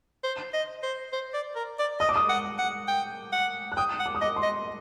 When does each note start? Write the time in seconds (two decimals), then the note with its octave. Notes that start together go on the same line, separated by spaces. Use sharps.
0.24 C5
0.53 D#5
0.83 C5
1.13 C5
1.34 D5
1.56 A#4
1.79 D5
2.00 D#5 D#6
2.09 D6
2.16 D#6
2.29 F#5
2.59 F#5
2.88 G5
3.32 F#5
3.72 F#6
3.77 G5 D#6
4.00 F#5
4.06 D6
4.15 D#6
4.21 D#5 D6
4.36 C6
4.43 D#5